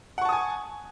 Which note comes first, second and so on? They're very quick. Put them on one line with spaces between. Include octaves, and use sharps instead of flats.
F#5 C#6 A5 D#6 G#5